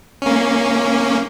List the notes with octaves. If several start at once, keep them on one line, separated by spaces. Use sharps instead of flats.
A#3 C#4